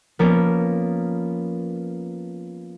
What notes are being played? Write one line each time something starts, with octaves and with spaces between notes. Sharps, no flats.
F3 A#3 B3 C#4 A#4